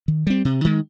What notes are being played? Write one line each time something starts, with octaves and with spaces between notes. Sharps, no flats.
D#3
G3 C4
C3
D#3 G#3